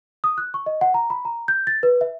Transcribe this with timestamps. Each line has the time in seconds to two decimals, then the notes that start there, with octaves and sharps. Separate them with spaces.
0.24 D#6
0.38 F#6
0.54 C#6
0.66 D#5
0.81 F#5
0.94 A#5
1.10 B5
1.25 A#5
1.48 G6
1.67 A6
1.83 B4
2.01 E5